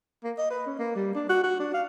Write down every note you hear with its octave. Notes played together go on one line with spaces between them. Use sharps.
A#3
D#5
B4
C#4
A#3
G3
D4
F#4
F#4
D4
F5